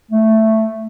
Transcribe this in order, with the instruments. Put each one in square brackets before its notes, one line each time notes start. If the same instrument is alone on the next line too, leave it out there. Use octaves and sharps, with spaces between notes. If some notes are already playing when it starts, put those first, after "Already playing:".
[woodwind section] A3